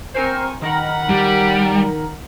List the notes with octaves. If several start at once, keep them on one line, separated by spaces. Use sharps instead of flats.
C4 A#4 C5 G#5 C#6
D#3 A#4 F#5 B5
G3